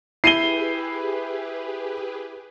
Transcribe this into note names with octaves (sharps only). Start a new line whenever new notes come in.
E4 G4 G#4 B4 C7 D#7 G7